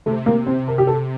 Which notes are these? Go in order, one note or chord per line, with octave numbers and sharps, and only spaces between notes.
C3 A3
A#3
C4
A#4
G4
A4